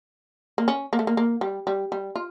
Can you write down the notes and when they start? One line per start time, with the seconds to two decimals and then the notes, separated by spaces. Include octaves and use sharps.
0.58 A#3
0.68 C#4
0.93 A#3
0.99 A3
1.07 A#3
1.17 A#3
1.41 G3
1.67 G3
1.92 G3
2.15 F4